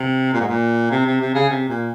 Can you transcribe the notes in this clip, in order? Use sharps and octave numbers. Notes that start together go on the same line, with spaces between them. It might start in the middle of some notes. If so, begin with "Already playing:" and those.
Already playing: C3
A#2
G#2
A#2
C3
C3
C3
C#3
C3
A#2